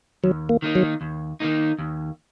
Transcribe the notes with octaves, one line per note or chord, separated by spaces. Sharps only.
D#2 F#3
A#3
D#3 A#3 D#4
F#3
D#2
D#3 A#3 D#4
D#2